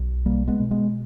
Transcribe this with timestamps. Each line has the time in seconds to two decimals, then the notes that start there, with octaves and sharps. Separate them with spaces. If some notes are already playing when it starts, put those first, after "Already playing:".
Already playing: B1
0.25 B2 G3 A#3
0.48 G#3 B3
0.60 B2
0.71 G#3 B3